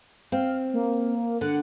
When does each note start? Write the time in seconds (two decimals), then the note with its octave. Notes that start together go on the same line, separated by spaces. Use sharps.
0.32 C4 F5
0.74 A#3
1.41 D3 F#5